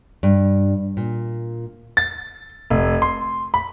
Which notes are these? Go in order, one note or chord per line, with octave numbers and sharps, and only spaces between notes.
G2
A#2
A6
F1
C6
B5